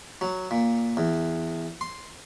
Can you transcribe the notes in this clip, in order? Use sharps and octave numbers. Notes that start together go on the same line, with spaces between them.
F#3
A#2
E2
C6